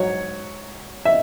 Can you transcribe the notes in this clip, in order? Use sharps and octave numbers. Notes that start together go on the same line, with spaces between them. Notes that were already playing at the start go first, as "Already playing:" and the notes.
Already playing: G#2 F#3 C#5
E5